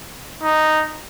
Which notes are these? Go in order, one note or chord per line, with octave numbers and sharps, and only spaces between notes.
D#4